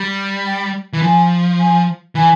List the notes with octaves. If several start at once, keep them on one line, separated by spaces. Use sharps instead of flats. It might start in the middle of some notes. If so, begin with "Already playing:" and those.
Already playing: G3
G5
E3
F3 G#5
G#5
E3 G#5